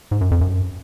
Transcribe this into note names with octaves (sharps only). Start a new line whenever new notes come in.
G#2
F#2
F2
F#2